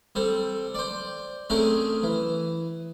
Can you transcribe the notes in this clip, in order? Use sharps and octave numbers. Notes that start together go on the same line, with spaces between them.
G3 C4 A4
C5 D5
A3 C4 C#4 G#4 A#4
E3